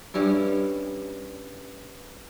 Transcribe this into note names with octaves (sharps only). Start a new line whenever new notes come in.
G2 G3 C#4 E4